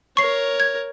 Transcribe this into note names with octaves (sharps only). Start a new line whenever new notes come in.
A#4 C#5 C#6 C7
G#6